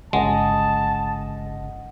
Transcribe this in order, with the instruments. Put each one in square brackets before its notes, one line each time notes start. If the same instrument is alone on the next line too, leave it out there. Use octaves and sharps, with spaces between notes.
[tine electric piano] G1 C#3 [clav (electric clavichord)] G#3 [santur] D#5 F#5 [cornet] A5